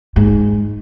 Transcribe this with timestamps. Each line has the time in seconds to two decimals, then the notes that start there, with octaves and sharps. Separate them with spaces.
0.16 G#2